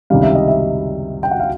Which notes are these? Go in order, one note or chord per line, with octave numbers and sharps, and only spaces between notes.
C#2 C3 D#3 G3 F5
E5
D#5
E5
G5
F#5
F5